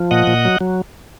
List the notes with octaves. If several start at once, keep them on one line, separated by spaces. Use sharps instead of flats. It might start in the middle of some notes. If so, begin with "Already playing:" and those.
Already playing: F3
A#2 D#5 F#5
A#2
F#3
F#3